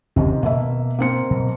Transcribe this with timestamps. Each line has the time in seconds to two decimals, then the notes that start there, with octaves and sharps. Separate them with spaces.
0.16 F#1 D#2 C3 D#3 C#4
0.43 B2 A#3 E5
0.99 A#3 C4 C#7
1.31 B2 F#3